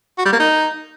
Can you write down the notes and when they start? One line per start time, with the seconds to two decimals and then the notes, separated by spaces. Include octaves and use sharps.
0.18 F#4
0.25 G3
0.33 A#3
0.40 D#4